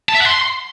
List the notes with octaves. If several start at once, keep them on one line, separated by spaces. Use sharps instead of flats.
A5
E5
F#5
C6